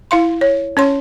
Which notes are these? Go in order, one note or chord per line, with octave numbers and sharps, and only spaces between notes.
E4 F5 C6
C#5
C#4 C#5 C6